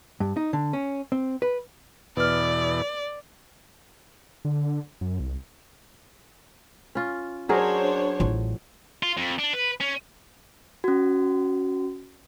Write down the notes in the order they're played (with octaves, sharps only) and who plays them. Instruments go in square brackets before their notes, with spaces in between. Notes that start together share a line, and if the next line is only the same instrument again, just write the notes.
[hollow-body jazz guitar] G2
D#4
D3
C#4
C4
B4
[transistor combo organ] E2 B2 [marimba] B4 F6 [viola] D5
[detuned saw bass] D3
F#2
C2
[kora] C#4 F4
[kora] F#3 G#4 A#4 [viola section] D4 C5 C#5
[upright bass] A1 F4
[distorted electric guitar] F4
F2
D4
B4
C#4
[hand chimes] C#4 F#4